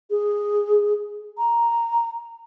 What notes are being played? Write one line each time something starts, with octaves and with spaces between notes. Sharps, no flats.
G#4
A#5